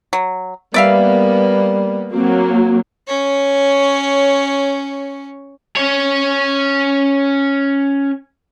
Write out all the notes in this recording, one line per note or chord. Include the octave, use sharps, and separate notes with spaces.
F#3
G3 A#3 B3 D5 E5 F5
F#3 A#3 C4
C#4 C#5
C#4 C#5